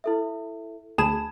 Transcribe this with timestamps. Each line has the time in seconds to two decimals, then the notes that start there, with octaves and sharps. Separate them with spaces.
0.04 E4 A4 E5
0.98 D2 G#4 A5 B5 G#6 E7